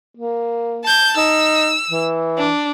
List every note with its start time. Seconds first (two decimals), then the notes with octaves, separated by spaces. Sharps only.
0.17 A#3
0.84 A5 G6
1.17 D#4 E6
1.89 E3
2.38 D4